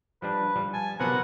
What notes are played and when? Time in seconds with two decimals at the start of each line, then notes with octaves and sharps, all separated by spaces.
0.22 F3 G3 D4 B4
0.56 F3 G3
0.73 G#5 A5
1.00 C3 F3 F#3 B3 A#4 F#5